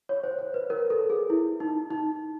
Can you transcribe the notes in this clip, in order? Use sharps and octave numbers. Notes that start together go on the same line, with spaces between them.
C#5
C5
C5
B4
A#4
A4
G#4
E4
D#4
D#4